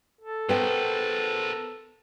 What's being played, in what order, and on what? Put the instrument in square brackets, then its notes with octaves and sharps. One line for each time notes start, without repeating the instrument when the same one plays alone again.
[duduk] A4
[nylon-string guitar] B3 G5 [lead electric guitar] A#4 C5